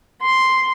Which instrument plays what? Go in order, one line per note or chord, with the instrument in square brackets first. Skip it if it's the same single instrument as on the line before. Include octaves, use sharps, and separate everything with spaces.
[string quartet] C6